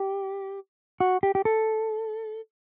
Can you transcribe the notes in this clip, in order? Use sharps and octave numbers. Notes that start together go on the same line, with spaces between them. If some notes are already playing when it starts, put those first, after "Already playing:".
Already playing: G4
F#4
G4
G4
A4